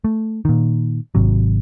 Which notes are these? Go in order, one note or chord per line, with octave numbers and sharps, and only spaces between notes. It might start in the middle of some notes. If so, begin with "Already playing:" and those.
A3
A#2 D#3
G#1 C3 F#3